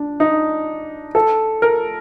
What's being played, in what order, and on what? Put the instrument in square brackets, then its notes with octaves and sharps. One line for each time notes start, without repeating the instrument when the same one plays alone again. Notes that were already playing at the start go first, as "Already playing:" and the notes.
Already playing: [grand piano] D4
D#4
A4
A#4